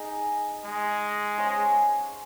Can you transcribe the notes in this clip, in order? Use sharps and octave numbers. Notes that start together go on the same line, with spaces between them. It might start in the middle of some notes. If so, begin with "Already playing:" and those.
Already playing: D#4 G#4 D#5
G#3
C#4 G#4 C5 F5